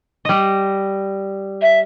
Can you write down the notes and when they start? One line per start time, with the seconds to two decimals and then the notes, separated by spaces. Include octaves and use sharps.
0.25 G3 D#5
1.61 E5